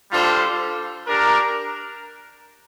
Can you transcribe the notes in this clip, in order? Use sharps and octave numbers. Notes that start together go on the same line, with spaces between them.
G3 D4 F4 A4 C5
D4 G4 A#4